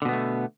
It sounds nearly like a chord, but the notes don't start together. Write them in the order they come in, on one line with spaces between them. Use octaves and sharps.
D3 B2 B3 A3